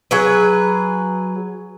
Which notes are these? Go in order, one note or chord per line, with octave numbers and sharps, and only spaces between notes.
F#3 G#4 B4